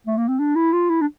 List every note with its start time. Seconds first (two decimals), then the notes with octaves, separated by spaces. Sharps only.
0.07 A3
0.17 A#3
0.28 C4
0.39 D4
0.56 E4
0.73 F4
0.89 E4
1.01 D4